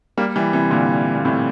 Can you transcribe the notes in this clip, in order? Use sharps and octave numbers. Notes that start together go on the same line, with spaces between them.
G3 A#3
E3 G3
C3 E3
A#2 D3
A#2
A2 C3